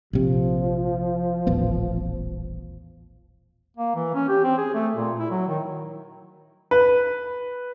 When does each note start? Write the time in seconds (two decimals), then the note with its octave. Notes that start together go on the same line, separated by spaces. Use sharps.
0.13 A#1 C3 F3
1.47 D#1 A1 B3
3.77 A#3
3.95 E3
4.15 C#4
4.29 G4
4.44 C4
4.58 G#4
4.74 A3
4.96 A#2
5.19 E4
5.31 F#3
5.47 D#3
6.71 B4